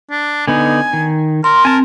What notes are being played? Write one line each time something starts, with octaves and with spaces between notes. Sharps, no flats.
D4
D3 B3 D#4 G#5
D#3
A#4 C6
C4 G#5 A5